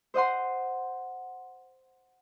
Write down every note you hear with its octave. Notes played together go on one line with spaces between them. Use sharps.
C5 D#5 F#5 C6